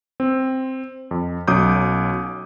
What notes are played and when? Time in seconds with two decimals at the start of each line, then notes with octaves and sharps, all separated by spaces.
0.20 C4
1.11 F2
1.47 B1 F#3 C#4 D6 D#6 G6